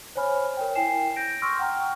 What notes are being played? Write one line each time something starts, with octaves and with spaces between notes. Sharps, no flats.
C5 C#5 G#5 B5 F6
A#4 C#5 G5
E4 G5 G#5 C7 E7
G6 A#6 D7
C6 C#6 E6 F6 A#6
F#5 G5 A#5 C#6 F6